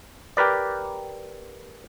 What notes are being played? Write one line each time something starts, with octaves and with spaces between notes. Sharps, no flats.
G4 A#4 B4 D5